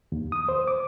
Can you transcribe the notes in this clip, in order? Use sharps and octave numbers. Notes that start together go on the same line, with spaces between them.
D#2
D#6
C5
D6